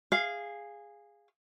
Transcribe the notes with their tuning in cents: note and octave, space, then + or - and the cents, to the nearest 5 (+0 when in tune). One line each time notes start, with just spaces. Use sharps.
G#4 -15 F5 +0